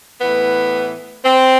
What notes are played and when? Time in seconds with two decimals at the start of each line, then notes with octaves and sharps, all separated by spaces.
0.21 A2 E3 B3
1.24 C4